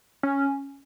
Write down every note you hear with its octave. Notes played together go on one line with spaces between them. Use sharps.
C#4